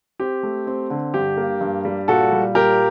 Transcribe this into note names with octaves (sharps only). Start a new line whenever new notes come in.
C4 G4
A3
C4
D3
G2 G4
A#3
G2
G3
A#2 F#4 A4
G3
A#2 G4 A#4